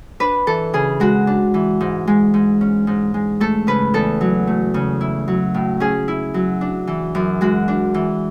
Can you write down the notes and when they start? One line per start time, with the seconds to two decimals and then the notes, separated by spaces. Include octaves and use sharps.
0.20 D4 B4
0.47 E3 A4
0.73 C#3 G#4
1.00 G#3 F#4
1.27 D4
1.54 E3
1.81 G#2
2.07 G#3
2.34 G#2
2.61 C#4
2.87 G#2
3.14 G#3
3.40 A3 A4
3.67 C#3 B4
3.94 E2 A4
4.21 F#3
4.47 A3
4.74 C#3
5.01 E4
5.28 F#3
5.54 A2
5.80 C#4 G#4
6.08 E4
6.34 F#3
6.61 D4
6.87 E3
7.15 F#2
7.41 G#3 F#4
7.68 D4
7.94 E3